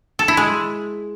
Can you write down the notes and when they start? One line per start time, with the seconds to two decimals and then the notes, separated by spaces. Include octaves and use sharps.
0.19 A4
0.28 E4
0.37 G#3